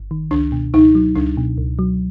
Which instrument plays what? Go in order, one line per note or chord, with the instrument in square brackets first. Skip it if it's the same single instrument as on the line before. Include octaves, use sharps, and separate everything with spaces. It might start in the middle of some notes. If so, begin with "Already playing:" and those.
Already playing: [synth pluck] G1
D#3
[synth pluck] C#2 [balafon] D4
[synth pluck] B2
[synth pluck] C#2 [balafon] D#4
[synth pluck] F#3
[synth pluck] C#2 [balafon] D4
[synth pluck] B2
C#2
F#3